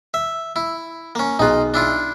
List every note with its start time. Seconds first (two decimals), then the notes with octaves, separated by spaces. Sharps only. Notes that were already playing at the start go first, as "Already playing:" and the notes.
0.14 E5
0.56 E4
1.15 A#3 C#4
1.39 B1 D#4 F4 G#4 F#6
1.74 D4 E4 F4